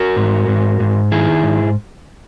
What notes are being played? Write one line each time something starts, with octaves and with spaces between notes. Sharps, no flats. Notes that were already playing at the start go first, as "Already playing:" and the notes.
Already playing: F#4 A#4
G#2
G#2
G#2
D#3 E4 G#4
G#2